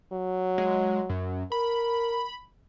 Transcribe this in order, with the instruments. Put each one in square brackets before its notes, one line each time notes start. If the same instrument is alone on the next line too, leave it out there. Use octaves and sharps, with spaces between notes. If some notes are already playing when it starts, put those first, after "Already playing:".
[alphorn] F#3
[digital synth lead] G#3
F#2
[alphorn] A#4 [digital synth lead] B5